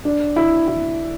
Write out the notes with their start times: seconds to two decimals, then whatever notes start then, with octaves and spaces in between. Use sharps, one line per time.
0.05 D4
0.36 E4
0.68 E4